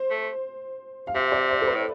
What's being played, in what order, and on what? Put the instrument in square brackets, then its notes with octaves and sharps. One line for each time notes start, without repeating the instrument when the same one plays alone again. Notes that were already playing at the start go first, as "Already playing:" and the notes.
Already playing: [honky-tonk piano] C5
[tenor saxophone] A3
[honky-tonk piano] F5
[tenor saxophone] C3 [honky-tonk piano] E5
[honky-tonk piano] D5
C5
A4
B4
[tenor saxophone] A2